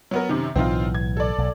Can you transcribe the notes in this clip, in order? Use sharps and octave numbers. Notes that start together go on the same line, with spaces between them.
F#3 B3 A#4
F#2 C3 D#3
B1 A2 E3 C4 D#4 F4
G#6
A4 D5
B1